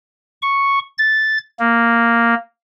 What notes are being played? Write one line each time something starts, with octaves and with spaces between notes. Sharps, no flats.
C#6
A6
A#3